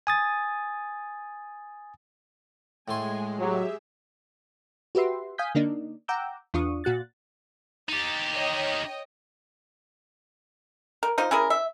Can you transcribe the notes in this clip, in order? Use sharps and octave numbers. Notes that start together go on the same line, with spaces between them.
G#5 D#6 A6
A2 G#3 A3 G#5 C6
F#3 G4 G#4 E5
F#4 G4 B4 E5 C6
F5 G#5 D#6 G6 B6
D3 A#3 D4 D#4
F#5 G5 A#5 D6 E6 G6
E2 D4 F4 C#6 D#6
A#2 F#4 F#6 A6
D#4 G4 A6
C#5 D#5 G5
A#4
D#4 F4 C5
C#4 E4 G#4 A#4
E5